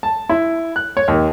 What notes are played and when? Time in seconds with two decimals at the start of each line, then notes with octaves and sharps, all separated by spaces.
0.03 A5
0.29 E4
0.76 F#6
0.97 C#5
1.08 D#2